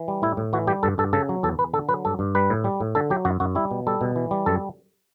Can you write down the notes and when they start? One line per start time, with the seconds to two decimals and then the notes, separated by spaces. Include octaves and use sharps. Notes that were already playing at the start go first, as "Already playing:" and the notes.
Already playing: E3
0.08 G3
0.22 A2 E4
0.37 A2
0.53 E3 F#4
0.67 G3 G4
0.83 G2 A4
0.98 G2 A4
1.13 C#3 A4
1.29 F#3
1.43 E2 A4
1.59 E2 B4
1.73 D3 A4
1.89 F#3 B4
2.05 G2 A4
2.19 G2
2.35 G3 B4
2.50 A2
2.64 G3
2.80 A2
2.95 D3 A4
3.10 F#3 G4
3.25 F#2 F#4
3.40 F#2 F#4
3.55 G3 E4
3.71 B2
3.87 G3 A4
4.01 B2
4.16 E3
4.31 G3
4.46 F#2 A4